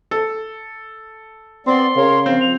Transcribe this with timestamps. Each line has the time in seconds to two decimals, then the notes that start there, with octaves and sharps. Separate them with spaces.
0.11 A4
1.67 B3 C4 D5 C6
1.96 C#3 A#4 C#5 F5
2.26 F3 C4 F5
2.41 F3 F7